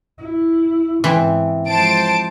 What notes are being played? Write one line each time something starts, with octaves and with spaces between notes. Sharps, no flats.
E4
G#2 C#3 E3 C4
F3 G#3 C5 A5 D7